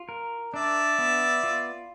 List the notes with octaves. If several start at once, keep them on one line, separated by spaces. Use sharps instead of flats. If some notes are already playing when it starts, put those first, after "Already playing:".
Already playing: F4
A#4
D4 D5 E5
B3
F4